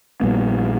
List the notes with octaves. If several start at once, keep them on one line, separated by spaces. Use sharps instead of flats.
A#1 A#2 G3 B3